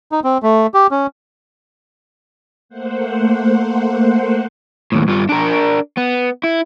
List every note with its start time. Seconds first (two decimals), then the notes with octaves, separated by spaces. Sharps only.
0.12 D#4
0.24 C4
0.43 A3
0.74 G4
0.91 C#4
2.69 A3 A#3 C5 F#5
4.92 D#2 A2
5.08 G2 F4
5.29 D4 A#4
5.97 B3
6.43 E4